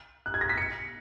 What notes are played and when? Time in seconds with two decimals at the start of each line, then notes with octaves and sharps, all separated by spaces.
0.26 F#6
0.34 G#6
0.41 A#6
0.49 B6
0.58 C#7